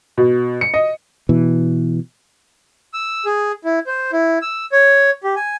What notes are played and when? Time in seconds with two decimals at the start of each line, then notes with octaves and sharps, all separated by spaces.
0.18 B2
0.61 C#7
0.74 D#5
1.29 B2 E3
2.94 E6
3.25 G#4
3.64 E4
3.87 C5
4.12 E4
4.42 E6
4.72 C#5
5.24 G4
5.36 G#5